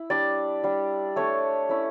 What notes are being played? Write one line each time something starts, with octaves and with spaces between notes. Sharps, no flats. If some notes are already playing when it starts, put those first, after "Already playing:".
Already playing: E4
G3 D4 D5
G3 D4
A3 D4 C#5
A3 C#4 E4